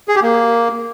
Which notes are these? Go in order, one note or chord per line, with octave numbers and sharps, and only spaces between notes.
G#4
G4
A#3